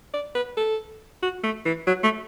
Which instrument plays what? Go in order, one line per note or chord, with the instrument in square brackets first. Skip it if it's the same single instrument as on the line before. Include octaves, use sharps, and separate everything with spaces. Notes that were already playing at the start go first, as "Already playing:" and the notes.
[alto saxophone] D5
B4
A4
F#4
A3
E3
F#3
A3